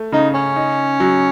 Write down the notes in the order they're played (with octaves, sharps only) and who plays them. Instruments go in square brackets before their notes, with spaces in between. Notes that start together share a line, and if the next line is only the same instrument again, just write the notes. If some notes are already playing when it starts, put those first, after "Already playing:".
Already playing: [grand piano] A3
[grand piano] C#3 [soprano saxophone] D#4
[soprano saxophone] C#4
[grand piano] D#4
F#3